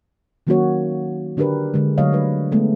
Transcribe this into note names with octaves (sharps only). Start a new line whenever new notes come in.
D#3 F#3 A#3 C#4 F#4 C#5
D3 D4 G4 A#4 B4
D3 G#3
D3 F#3 A3 C#5 D#5 F5
G3 D4 B4
G#3 A3 B3